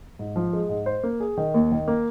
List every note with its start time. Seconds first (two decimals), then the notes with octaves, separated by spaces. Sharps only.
0.19 G#2
0.36 F3
0.53 G#3
0.69 G#2
0.86 C5
1.03 A#3
1.20 G#4
1.37 D#3
1.54 D#2
1.72 D#3
1.88 A#3